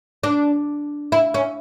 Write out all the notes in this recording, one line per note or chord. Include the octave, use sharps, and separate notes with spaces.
D4
E4
C#4